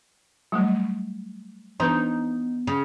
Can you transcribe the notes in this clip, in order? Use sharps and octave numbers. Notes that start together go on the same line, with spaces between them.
F#3 G3 A3
E3 B3 D4 D#4 B4
C#3